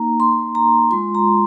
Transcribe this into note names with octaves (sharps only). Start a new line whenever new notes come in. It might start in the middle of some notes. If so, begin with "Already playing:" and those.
Already playing: A#3 D#4 A#5
C6
A#5
G#3 F4 C6
A#5